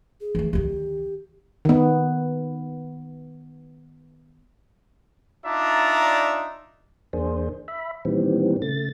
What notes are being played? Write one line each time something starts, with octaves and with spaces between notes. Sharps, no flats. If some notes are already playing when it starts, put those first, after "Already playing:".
G#4
E3 A3
D2 D#3 G4
D#3 B3
D4 D#4 F4 D5 E5 A#5
E2 A#3 D4 G#4 C5
E5 B5
A#2 D#3 E3 G3 B3 C4
C#3 A3 A6